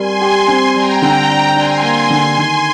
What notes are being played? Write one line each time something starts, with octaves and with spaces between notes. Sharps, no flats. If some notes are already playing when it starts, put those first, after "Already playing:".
Already playing: G3 C4 G4 A#4 G#5 C6
G4
C4
G3 G5 A#5
D3
D4
D4 G#5 C6
A#3
D3
D#3